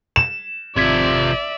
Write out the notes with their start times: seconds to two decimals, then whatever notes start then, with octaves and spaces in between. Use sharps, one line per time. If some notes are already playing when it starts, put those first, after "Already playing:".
0.16 E7
0.76 G#1 C3 F3 D5 E5 G#6 B6